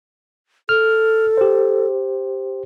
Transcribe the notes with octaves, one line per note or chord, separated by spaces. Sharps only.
A4 F6
G4 C5